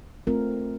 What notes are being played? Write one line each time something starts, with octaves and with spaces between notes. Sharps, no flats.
A3 C4 F4 A#4